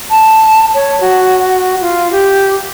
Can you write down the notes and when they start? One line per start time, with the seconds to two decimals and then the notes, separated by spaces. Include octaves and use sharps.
0.11 A5
0.74 C#5
1.01 F#4
1.81 F4
2.12 G4